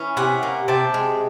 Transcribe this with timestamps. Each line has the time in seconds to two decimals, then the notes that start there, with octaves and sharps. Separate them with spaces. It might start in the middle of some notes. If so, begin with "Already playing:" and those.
Already playing: E3 C#4
0.17 C3 F#5 G#5
0.43 A#3
0.68 C3 G5 A5
0.94 G#3